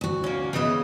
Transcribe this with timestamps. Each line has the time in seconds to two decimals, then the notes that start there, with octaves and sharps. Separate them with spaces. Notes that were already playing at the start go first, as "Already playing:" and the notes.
0.01 D2 F#4
0.24 A#3 C#4
0.53 C#3 E3 B3 D#5 E5